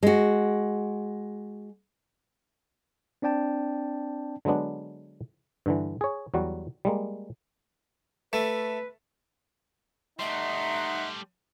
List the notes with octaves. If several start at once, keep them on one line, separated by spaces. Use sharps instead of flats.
G#3 F#4
C4 D4 D5 G5 A5
D3 F#3 G#3 B3 D4
G2 D3 E3
G#4 C#5
E2 F#3 G3 F#4
G3 G#3 A#3
A3 B4
G3 A3 D#4 E5 F#5 C6